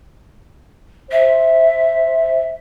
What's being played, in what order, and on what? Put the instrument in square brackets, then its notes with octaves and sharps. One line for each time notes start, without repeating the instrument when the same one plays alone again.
[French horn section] C5 [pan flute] E5